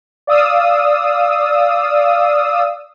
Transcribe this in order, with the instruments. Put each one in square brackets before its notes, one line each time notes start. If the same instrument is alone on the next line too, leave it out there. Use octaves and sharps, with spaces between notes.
[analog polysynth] D5 F5 D#6 E6